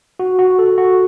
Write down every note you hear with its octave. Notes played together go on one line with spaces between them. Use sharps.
F#4
F#4
A4
F#4